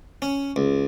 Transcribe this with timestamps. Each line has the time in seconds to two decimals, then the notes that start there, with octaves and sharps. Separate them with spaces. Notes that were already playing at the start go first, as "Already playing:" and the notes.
0.22 C#4
0.56 C#2